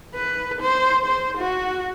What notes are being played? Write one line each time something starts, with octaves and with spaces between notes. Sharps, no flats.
B4
C5
C5
F#4